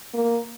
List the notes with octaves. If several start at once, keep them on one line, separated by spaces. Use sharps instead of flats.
A#3